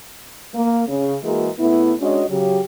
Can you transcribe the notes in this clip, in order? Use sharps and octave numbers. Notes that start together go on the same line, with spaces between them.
A#3
C#3
E3 G#3 A#3 F#4 G#4 A#4
C#3 A3 B3 E4
G#3 C#4 D4 F#4 C#5 D#5
C#3 F#3 G4